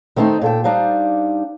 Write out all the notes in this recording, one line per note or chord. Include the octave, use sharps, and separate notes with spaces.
D#3 A3 C4 D4 D#4
A#2 A4 G5
G3 D4 D#4 C5 F5